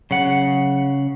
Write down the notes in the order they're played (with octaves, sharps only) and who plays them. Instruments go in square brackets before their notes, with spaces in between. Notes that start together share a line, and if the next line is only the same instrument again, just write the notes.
[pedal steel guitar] C#3 [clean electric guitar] F#3 F#5